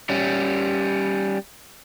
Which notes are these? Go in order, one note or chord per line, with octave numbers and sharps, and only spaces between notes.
G3 C#4